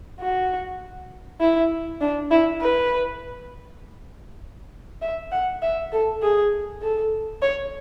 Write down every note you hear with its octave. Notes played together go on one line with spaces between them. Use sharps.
F#4
E4
D4
E4
B4
E5
F#5
E5
A4
G#4
A4
C#5